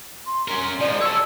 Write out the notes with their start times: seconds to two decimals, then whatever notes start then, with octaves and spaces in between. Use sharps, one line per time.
0.26 C6
0.48 C#4 A#4
0.80 F3 G#3 D5
1.01 C#5 A5 E6